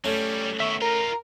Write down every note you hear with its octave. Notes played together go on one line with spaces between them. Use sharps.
F#3 G3 A3 C#4 C#5
C#5
D#3 B3 E5 C#6
D#4 F4 A#4 A#5